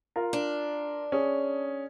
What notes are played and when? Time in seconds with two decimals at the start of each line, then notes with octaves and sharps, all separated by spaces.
0.16 F4 A#4
0.33 D4
1.12 C#4 G#4